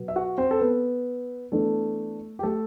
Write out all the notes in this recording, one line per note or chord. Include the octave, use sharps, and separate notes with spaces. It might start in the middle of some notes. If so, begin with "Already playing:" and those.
Already playing: B2 F#3 B3
E5
F#4 F#5
C4 C5
A4
B3 B4
E3 A3 B3 D4 A4
G4
A3 A4